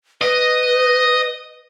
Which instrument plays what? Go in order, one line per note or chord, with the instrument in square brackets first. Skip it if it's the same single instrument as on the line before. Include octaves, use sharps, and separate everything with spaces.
[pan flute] B4 [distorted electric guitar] D#5